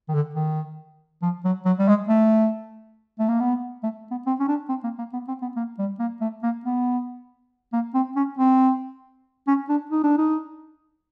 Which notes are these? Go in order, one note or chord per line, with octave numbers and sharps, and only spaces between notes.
D#3
D3
D#3
F3
F#3
F#3
G3
G#3
A3
A3
A#3
B3
A3
B3
C4
C#4
D4
C4
A#3
A#3
B3
C4
B3
A#3
G3
A#3
A3
A#3
B3
A#3
C4
C#4
C4
C#4
D4
D#4
D4
D#4